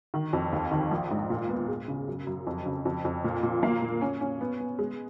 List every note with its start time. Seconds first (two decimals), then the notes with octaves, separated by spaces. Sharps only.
0.14 D#3
0.33 F2
0.52 D#2
0.71 D#3
0.91 A#1
1.11 G#2
1.30 A#2
1.49 B3
1.68 G#3
1.88 C#3
2.08 F#2
2.27 F#2
2.47 F2
2.66 C#3
2.85 F2
3.05 F2
3.24 A#2
3.43 A#2
3.63 A#3
3.82 A#2
4.01 C#4
4.21 C#4
4.41 B3
4.60 B3
4.79 G#3